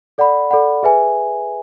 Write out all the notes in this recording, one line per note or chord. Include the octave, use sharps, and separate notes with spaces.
A4 D5 F#5 B5
A4 D5 F#5 B5
G#4 B4 E5 G#5